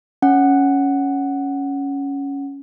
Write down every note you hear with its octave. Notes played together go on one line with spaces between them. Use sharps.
C#4 F#5